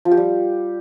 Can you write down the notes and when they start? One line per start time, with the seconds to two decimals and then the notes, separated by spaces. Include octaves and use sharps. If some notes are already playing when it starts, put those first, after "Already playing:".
0.05 F3
0.11 G4
0.17 G3